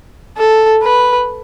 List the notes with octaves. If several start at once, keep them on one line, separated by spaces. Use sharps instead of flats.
A4
B4